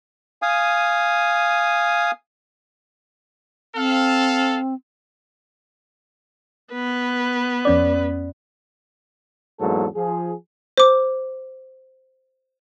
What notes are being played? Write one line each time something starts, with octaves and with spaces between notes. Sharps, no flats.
F5 G#5 D#6
C4 A4 F5
B3 B4
F2 C#4 D5
E2 G#2 F#3 A#3 A4
F3 G#4
C5 D6